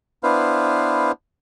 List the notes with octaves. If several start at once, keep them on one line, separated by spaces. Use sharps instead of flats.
B3 D4 E4 B4 C5 F5